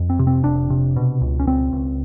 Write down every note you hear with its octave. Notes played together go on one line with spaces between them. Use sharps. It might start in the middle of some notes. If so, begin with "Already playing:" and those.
Already playing: F2
C4
C3
C4
F1 D4
C3
B2
C#2
C#4
C#2 C4
C#2